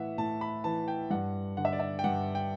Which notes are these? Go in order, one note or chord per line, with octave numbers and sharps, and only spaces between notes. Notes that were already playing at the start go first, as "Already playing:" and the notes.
Already playing: A2 E3 E5 F#5
A2 A5
B5
E3 A5
G5
G2 F#5
D3 F#5
E5
D5
E5
G5
G2 F#5
G5